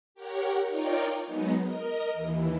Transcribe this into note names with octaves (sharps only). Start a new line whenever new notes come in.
G4 A#4 C#5 F#5
D#4 F4 A#4 C#5 D5 G5
F#3 G#3 B3 D#4
A#4 D#5
D#2 E3